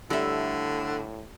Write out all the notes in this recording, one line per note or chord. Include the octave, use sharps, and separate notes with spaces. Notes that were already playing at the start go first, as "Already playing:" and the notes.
A2 D3 G3 E5